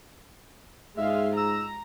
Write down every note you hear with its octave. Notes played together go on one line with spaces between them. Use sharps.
G#2 G#3 F4 E5 F5
A#5 E6